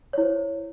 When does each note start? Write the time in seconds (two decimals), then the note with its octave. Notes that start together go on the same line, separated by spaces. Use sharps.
0.13 C#5
0.18 E4
0.22 C5